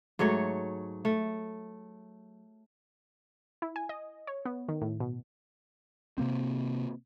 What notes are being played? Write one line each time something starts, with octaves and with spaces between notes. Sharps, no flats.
G#2 F#3 A3 C#5
A3
E4
G#5
D#5
C#5
B3
D#3
A2
B2
C3 A#3 C4